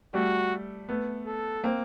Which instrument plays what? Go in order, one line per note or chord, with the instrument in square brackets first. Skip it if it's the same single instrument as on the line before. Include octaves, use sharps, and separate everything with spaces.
[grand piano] G3 A3 [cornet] F#4
[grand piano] A3 B3
[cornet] A4
[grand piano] A#3 C4